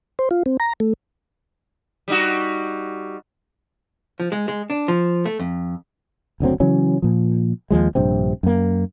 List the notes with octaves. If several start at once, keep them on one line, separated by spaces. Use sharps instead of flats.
C5
F4
C4
A#5
A3
G3 D#4 F#4
F3
G#3
G#3
D4
F3
A3
F2
F#1 D2 F#3 C4
C#3 E3 F#3 C#4
A#2 F3
D#2 F3 G#3
A#1 G2 C3 C4
F#2 A#3